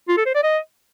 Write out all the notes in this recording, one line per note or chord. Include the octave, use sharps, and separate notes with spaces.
F4
A4
C5
D5
D#5